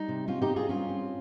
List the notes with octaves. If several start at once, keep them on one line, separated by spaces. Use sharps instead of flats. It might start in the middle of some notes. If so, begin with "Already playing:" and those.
Already playing: G3 D#4
C3
C4 C#4 F4
D#4 G4
C4
F4 G#4
G2 C#4 F4
C4